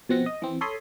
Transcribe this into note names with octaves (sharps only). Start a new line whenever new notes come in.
B2 F3 C4 F#5 A#6
D#5
E3 C4
A4 C#5 B5 C6 D#6